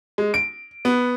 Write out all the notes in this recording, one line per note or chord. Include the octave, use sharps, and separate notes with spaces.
G#3
D7
B3